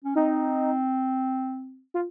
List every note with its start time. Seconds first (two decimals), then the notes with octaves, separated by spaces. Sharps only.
0.04 C#4
0.15 C4 D#4
1.94 F4